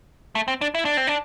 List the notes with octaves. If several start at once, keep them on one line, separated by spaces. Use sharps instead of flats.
A3
C4
D4
E4
D4
C4
D4